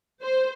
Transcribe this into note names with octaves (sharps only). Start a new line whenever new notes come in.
C5